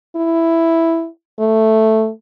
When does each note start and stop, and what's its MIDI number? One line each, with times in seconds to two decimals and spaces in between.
0.16 1.07 64
1.39 2.09 57